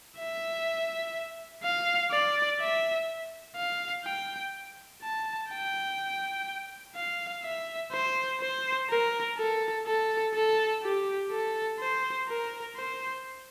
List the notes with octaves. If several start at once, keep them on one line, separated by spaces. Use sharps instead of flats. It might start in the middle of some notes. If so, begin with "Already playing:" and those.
E5
F5
D5
E5
F5
G5
A5
G5
F5
E5
C5
C5
A#4
A4
A4
A4
G4
A4
C5
A#4
C5